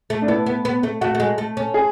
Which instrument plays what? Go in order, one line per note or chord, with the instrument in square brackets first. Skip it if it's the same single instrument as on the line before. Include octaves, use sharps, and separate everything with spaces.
[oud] A3
[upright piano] D4
[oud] B3 [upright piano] E4
[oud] B3
B3
A3
[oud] A3 [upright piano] F#4
[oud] A3
G#3
A3
C#4
[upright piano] G#4